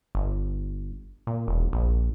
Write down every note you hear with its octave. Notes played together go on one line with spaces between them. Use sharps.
G1
A#2
E1
A#1